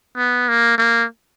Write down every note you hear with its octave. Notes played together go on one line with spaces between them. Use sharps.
B3
A#3
A#3